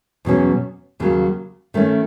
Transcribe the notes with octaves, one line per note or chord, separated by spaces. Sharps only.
E2 B2 F#3 C#4
D#2 C#3 F#3
D#3 A3 C#4